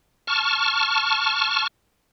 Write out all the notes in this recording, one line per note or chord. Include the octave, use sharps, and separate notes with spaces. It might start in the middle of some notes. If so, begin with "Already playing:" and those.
A5 C#6 F6